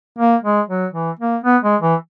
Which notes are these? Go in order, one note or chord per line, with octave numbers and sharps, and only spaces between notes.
A#3
G#3
F#3
E3
A#3
B3
G#3
E3